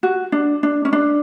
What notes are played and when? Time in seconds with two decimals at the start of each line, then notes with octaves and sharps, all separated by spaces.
0.03 F#4
0.32 D4
0.63 D4
0.85 C#4
0.93 D4